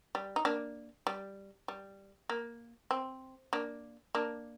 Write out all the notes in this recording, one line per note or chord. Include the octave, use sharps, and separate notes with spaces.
G3
D#4
A#3 D4
G3
G3
A#3
C4
A#3 D4
A#3 D4